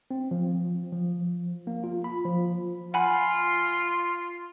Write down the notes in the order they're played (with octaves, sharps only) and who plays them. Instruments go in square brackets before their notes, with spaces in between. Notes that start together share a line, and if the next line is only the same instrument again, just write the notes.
[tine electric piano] C4
F3
F3
A#3
F4
B5
F3
[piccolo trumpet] F4 [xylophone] F#5 G#5 B5